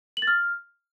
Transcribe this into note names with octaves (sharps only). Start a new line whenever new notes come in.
F#7
A6
F6